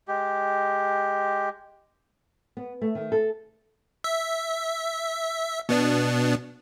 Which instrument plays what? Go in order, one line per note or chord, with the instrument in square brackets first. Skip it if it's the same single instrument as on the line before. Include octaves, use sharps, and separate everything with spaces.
[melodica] G#3 G4
[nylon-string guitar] B3
A3
D#3
A4
[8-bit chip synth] E5
B2 B3 D4